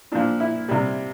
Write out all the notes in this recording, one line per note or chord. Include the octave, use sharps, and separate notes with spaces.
A#2 F3 D4
E4
C3 G3